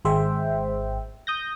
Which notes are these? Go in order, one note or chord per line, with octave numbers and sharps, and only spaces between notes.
G#1 G#3 C5 E5 G5
D#6 G6 A#6